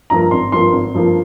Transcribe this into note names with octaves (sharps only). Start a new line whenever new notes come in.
G2 F3 A#3 A#5
G#1 C6
G2 F3 A#3 C6
G#1
G2 F3 A#3